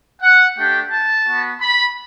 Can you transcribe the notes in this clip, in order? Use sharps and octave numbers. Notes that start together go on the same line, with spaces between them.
F#5
A3 D4 G4 G5
A5
B3 F#4
B5